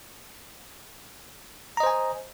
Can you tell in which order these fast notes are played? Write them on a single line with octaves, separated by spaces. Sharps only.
A#5 D#5 C5 G#5